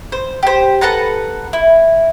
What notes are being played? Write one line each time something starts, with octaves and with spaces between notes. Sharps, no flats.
C5
G4 C5
A4 B4 F#5 A#5
E4